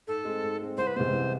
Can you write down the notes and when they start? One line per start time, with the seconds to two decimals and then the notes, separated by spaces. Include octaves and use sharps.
0.07 G#2 A4
0.25 G#3 C4
0.42 G#2
0.60 G#3 C4
0.77 C2 C5
0.87 B4
0.95 C3 E3 G#3 B3 C5
1.12 C2